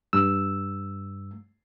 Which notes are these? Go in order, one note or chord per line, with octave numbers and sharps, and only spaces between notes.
G2 E6